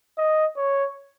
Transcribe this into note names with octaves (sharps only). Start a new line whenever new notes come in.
D#5
C#5